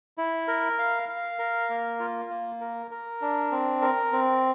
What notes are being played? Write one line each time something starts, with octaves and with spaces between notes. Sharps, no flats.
E4
A#4
F5
F5
A#4
A#3
F4
A#3
A#4
A#4
D4
C4
A#4
C4